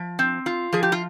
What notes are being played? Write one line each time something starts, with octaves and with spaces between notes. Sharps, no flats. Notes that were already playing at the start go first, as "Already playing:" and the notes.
Already playing: F3
C4
F4
F3 G#4
G4
F4